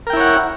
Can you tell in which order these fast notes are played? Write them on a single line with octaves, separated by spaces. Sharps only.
A#4 G5 E4 C#5 F#5